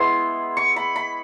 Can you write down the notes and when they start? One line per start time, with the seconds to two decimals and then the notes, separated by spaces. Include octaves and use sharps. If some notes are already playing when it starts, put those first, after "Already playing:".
Already playing: G#3 B3 E4 C6
0.57 C#6
0.76 B5
0.96 B5